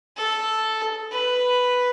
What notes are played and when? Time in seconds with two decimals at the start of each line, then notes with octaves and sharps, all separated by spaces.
0.17 A4
1.11 B4